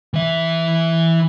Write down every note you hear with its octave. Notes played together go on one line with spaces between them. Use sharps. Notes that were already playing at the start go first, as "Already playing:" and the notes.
E3 E5